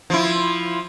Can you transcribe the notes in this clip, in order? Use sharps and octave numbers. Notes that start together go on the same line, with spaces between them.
F3 E4